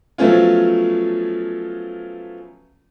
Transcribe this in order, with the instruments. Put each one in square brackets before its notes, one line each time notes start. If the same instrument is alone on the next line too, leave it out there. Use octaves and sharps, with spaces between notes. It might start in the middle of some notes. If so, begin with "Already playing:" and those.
[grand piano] F3 F#3 A3 B3 C#4 F4